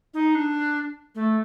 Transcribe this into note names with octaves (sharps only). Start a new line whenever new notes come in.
D#4
D4
A3